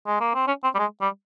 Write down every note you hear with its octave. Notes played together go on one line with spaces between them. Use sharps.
G#3
A#3
C4
C#4
C4
G3
G#3
G3